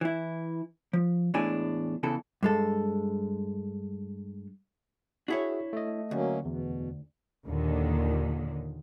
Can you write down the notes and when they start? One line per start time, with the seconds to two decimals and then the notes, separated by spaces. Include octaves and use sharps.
0.01 E3 E4
0.93 F3
1.34 E2 A2 G#3 D4 E4 G#5
2.03 E2 C#3 E3 A4
2.43 G2 G#3 A4
5.28 D4 E4 F#4 G#4 C#5 E5
5.73 A3 D#5
6.11 D2 F#3 A#3 C#4
6.45 E2 B2
7.46 D#2 A#2 D3 D#3